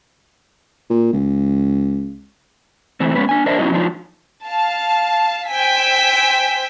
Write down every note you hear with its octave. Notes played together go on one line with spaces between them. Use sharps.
A#2
C#2
E3 A3 C4
G#3 B3 C#4 B4
D4 G#5
D4 A#4 C5 D#5 E5
F#3 B3 C#4 D#4 E4 D#5
F3 F#3 D4 D#4 F4
F5 A5
C5 G5 G#5 E6 B6